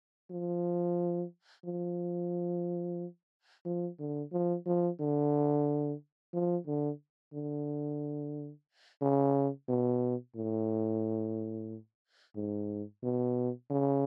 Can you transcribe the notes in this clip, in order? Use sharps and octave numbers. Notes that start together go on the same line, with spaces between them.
F3
F3
F3
D3
F3
F3
D3
F3
D3
D3
C#3
B2
A2
G#2
B2
C#3